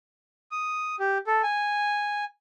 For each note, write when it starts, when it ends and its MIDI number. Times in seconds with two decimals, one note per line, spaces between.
0.51 0.96 87
1.00 1.18 67
1.27 1.42 69
1.43 2.24 80